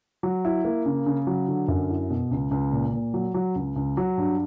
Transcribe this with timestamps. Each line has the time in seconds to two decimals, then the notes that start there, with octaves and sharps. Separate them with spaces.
0.23 F#3
0.45 E4
0.65 A#3
0.86 C#3
1.06 C#3
1.27 F#3
1.48 D3
1.68 F#2
1.90 E4
2.10 B2
2.31 C#2
2.51 C#2
2.72 A#2
2.93 A#2
3.14 F#3
3.34 F#3
3.55 C#2
3.76 C#2
3.97 F#3
4.17 G2